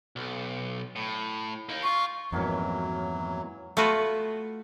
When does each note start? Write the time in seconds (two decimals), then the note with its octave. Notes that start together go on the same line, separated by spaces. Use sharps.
0.16 B1
0.96 A2
1.69 A#3 D#4
1.83 F4 C#6
2.32 F2 G#2 B2 E3 F#3 A#3 C#4
3.77 A3 B3 F4 F#4 B4